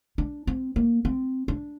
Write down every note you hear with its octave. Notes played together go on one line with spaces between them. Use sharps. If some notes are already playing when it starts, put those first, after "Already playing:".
D4
C4
A#3
C4
D4